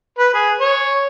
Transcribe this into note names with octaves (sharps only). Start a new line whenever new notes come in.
B4
G#4
C#5